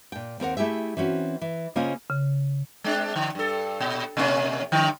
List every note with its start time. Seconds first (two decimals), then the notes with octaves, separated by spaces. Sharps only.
0.12 A#2 G5
0.40 D#2 C4 A#4 F#5
0.57 A3 E4 G4 G#4 E5
0.97 E3 C4 C#4 F#4
1.41 E3
1.76 C#3 A#3 C#4 F4 C5 D#5
2.10 C#3
2.84 G#3 C4 D4
3.16 D3
3.35 G2 A4
3.80 A#2
4.17 B2 A#3 C#4
4.72 G2 D3